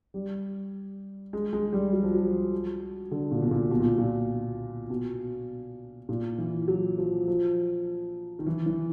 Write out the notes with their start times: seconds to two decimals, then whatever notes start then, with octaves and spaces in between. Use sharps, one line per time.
0.14 G3
1.33 G#3
1.53 G#3
1.73 G3
1.93 F#3
2.03 F3
2.14 F#3
3.11 D3
3.31 A#2
3.42 B2
3.51 A#2
3.71 B2
3.80 A#2
3.98 A#2
4.90 B2
6.09 A#2
6.38 E3
6.68 F#3
6.98 F3
7.28 F3
8.39 D#3
8.46 E3
8.66 E3